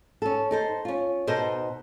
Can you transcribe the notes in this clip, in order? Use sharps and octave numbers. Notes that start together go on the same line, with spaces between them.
C#4 A4
D#4 A4 C5
C#4 F4
B2 D#4 A4 C5